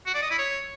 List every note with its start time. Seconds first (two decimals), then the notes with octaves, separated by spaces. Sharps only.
0.06 F#4
0.14 D5
0.22 D#5
0.30 E4
0.38 C#5